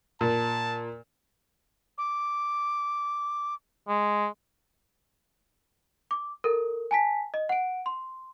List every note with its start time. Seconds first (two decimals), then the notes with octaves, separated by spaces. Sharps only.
0.21 A#2 A5
1.98 D6
3.88 G#3
6.11 D6
6.44 A4 A#4
6.91 G#5 A5 B6
7.34 D#5
7.49 F#5 D7
7.86 C6